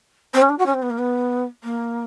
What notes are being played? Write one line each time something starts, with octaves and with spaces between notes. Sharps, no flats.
C4
C#4
D4
F#4
C#4
C4
B3
A#3
B3
A#3